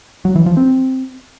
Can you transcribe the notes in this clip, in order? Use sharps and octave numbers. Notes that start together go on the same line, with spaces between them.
F#3
E3
F3
C4